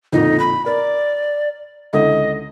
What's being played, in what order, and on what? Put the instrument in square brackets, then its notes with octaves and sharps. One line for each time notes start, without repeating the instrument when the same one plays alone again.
[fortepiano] F2 A#2 D3 [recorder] D#4
[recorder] B5
[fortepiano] A#4 [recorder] D5
[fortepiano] C#2 D3 E4 [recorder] D#5